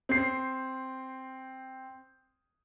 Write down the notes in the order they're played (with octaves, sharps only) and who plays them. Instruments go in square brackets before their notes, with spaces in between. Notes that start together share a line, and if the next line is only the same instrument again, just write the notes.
[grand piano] C4 C7